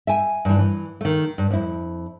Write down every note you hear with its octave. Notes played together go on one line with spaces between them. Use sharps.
E5 G5 G#5
G2 E3
E3
D#3 A3
G2
F2 E4